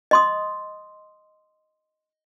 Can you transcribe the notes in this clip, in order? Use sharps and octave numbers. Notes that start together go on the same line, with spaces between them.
D#5 C6 D#6